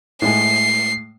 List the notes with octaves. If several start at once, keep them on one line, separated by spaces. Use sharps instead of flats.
A2 G#3 C7